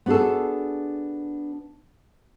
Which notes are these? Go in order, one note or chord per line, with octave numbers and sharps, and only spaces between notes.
B3 D4 F#4 G#4 A4